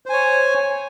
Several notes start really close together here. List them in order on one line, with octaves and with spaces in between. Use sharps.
C5 G#5 C#5